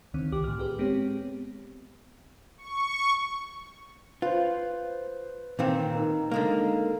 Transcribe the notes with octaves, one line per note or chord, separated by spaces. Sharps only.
D2 D3 D#3 C4
C2 G4 D6
A2 F6
G4 G#4 B4
G#3 B3 C4 G4 C#5
C#6
F4 B4 C5
A#2 D#3 C4 B4
D#4 A#4
D3 G#3 A#3